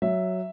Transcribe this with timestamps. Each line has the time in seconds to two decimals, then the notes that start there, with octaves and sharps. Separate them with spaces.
0.02 F#3 E5